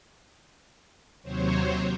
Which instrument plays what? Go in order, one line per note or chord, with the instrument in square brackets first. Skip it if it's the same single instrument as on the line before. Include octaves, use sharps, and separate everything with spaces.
[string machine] D#2 C3 F#3 C5 C#5